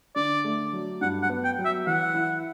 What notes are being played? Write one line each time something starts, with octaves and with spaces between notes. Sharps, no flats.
D3 D5
A3
F#3
G2 F#5
F#5
B3
G5
F#3
E5
E3 F#5
E4